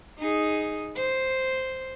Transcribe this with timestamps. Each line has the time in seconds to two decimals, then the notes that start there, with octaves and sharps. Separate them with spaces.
0.19 D#4 G#4
0.96 C5